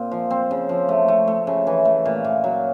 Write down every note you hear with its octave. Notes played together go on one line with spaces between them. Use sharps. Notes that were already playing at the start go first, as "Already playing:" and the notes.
Already playing: A#2 C4
F3
C4
C#3
F3
A3
A3
A3
C#3
E3
A3
A#2
A#2
F#3